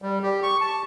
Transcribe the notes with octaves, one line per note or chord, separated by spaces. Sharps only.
G3
G4
C#6
A5